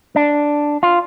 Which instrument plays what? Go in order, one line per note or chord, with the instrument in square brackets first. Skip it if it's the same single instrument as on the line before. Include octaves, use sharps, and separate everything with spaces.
[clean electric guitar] D4
F4